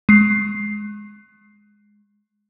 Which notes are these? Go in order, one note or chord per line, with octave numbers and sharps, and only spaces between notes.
G#3 C7